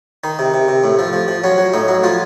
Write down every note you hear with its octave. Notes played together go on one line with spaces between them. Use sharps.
D#3 D#4
C3
C3
C3
A2
F3
F3
F3
F#3 C#4
F#3
A2 D#4
F#3
F3 F4